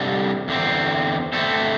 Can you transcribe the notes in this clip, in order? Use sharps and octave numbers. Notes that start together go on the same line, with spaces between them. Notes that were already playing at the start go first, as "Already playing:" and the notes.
Already playing: C3 G3 D4 A4
E2 D3 C4
D3 A3 C4 A4